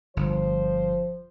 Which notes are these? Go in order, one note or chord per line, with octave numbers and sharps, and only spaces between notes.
G1 F3 C5